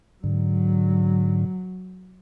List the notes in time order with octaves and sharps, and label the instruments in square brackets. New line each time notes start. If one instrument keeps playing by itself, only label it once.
[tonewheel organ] G#2 D3 [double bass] F#3